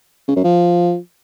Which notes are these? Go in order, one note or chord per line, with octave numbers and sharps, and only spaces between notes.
C#3
F#2
F3